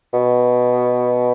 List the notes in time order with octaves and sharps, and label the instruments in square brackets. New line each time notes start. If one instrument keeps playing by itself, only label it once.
[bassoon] B2